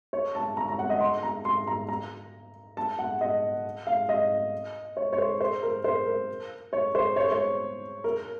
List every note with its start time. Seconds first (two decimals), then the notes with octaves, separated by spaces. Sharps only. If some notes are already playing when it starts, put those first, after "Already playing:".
0.13 C#5
0.35 A5
0.57 A#5
0.68 A#5
0.79 F#5
0.90 D#5
1.00 C6
1.23 A#5
1.45 C6
1.67 A#5
1.89 A#5
2.77 A5
2.99 F#5
3.21 D#5
3.87 F5
4.09 D#5
4.97 C#5
5.13 C#5
5.18 C5
5.40 C5
5.63 A#4
5.84 C5
6.06 A#4
6.73 C#5
6.95 C5
7.16 C#5
7.24 C5
7.32 C#5
8.04 A#4